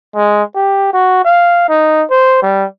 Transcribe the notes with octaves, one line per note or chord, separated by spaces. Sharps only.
G#3
G4
F#4
F5
D#4
C5
G3